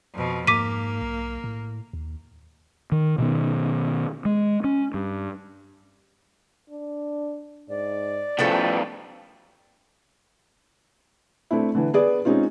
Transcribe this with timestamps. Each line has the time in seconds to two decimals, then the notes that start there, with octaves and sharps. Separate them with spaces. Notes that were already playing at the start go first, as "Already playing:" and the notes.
0.14 F2 B2
0.47 G#2 A#3 D6 B6 D#7
1.02 B1
1.44 A2
1.93 D#2
2.92 D#3
3.18 B2 D#3 B3
4.25 G#3
4.64 C#4
4.94 G2
6.70 D4
7.69 G#2 D5
8.38 A2 C#3 F3 A4 B4 G5
11.51 A3 C4 D4 E4
11.75 D3 E3
11.94 B3 G#4 D5
12.25 G#3 C4 C#4 D#4 F4